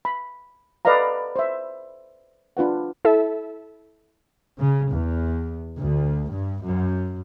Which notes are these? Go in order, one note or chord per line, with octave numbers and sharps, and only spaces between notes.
B5
A4 B4 D5 D#5 F5 A#5
C5 E5
D4 F4 B4 F#5
E4 A4 E5
C#3
E2
D2
G2
F#2